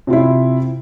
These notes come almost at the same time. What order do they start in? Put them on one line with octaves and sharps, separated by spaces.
C3 F4 E4